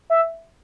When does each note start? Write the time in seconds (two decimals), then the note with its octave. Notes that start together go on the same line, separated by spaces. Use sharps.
0.10 E5